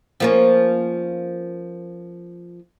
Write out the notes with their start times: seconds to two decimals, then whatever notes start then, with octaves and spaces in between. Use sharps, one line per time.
0.20 F3 A#3 C#4